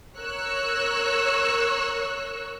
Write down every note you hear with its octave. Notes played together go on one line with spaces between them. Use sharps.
A#4 C#5 C#6 E6 F#6